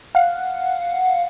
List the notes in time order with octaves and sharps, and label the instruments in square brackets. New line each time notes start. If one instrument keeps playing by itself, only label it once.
[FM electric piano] F5 F#5